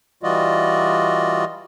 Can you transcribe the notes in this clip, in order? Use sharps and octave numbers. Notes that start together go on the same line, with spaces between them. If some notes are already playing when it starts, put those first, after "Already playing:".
E3 G3 F4 F#4 D5 D#5